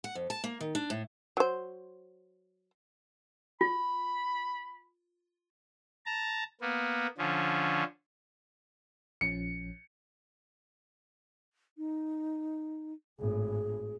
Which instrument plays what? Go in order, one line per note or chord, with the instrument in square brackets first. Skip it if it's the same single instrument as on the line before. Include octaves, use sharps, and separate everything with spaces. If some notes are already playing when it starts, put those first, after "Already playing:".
[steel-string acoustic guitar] F#5
F2
A5
A#3
D#3
D4
A2
[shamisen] F#3 C5
[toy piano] F4 [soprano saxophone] B5
[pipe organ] A5 A#5
A#3 B3
D3 F3 C#4
[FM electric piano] A#1 F3 C#4 [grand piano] C#7
[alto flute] D#4
[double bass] G#1 A2 [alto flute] G#4